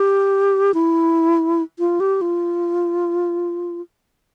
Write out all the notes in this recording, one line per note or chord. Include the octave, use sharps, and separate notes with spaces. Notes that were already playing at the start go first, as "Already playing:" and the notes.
Already playing: G4
E4
F4
G4
F4